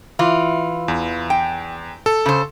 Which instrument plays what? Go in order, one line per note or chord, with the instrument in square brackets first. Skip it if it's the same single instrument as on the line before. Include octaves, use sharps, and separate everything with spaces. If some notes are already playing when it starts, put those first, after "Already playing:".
[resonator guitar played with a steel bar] E3 F4
[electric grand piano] E2
[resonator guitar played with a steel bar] G5
[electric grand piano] A4
[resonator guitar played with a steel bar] C#3 C5